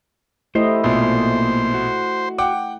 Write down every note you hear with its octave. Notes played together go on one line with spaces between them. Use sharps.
A3 E4 G4 C5 D#5
A#1 B2 A#3 C5
F#4
F#5 G5 D6